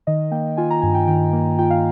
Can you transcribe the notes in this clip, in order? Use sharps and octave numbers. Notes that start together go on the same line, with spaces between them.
D#3 D#5
A#3 G5
F4 G#5
A#5
G2 G#5
G5
D#3 G5
A#3
F4 G5
F5